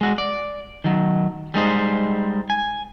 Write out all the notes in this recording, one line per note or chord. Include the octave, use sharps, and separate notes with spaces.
G#3 F#4
D5
D#3 F#3
G3 G#3 D#4 C5
G#5